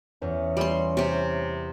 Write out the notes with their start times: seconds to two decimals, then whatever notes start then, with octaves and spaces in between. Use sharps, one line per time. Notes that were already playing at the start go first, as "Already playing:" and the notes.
0.22 E2 C#4
0.57 G3 C6
0.97 C3 G4